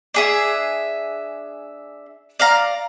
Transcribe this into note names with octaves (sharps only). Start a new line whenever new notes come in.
D4 G#4 E5
D5 F5 A#5